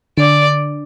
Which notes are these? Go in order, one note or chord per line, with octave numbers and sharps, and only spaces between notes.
D3 D5